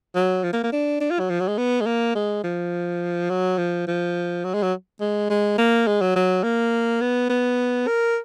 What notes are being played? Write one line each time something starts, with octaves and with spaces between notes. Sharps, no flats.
F#3
F3
A#3
A#3
D4
D4
F4
F#3
F3
F#3
G#3
B3
G#3
A#3
G#3
F3
F#3
F3
F3
F#3
G#3
F#3
G#3
G#3
A#3
G#3
F#3
F#3
A#3
B3
B3
A#4